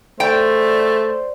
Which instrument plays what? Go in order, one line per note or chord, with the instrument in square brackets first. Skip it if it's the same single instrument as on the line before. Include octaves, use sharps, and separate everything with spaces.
[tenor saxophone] A3 [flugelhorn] C5 [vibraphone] D5 [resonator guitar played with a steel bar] G5